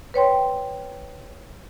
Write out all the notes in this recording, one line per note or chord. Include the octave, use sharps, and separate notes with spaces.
B4 C#5 G5 C6